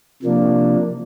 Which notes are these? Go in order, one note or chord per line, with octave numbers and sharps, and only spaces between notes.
C3 F3 A#3 D4